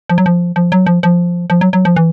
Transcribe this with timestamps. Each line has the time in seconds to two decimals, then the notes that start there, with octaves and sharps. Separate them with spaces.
0.09 F3
0.18 F#3
0.26 F3
0.56 F3
0.72 F#3
0.86 F3
1.03 F3
1.50 F3
1.61 F#3
1.73 F#3
1.85 F3
1.96 E3